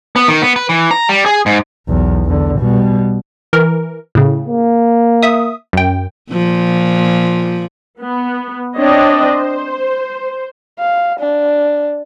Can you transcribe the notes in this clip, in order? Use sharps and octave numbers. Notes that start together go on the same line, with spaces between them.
B3
D#3
B3
B4
E3
A#5
G3
G#4
G#2
B1 E2
E2 D3
B2 G3
E3 A#4
A2 C#3
A#3
E5 D#6
F#2 G5
A#2 F3
B3
C4 D4 C#5 D#5 G5
C5
F5
D4